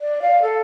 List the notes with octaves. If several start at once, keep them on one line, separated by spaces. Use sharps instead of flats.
D5
F5
A4